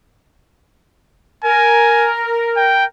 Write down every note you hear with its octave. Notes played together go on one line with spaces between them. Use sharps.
A#4 G#5
G5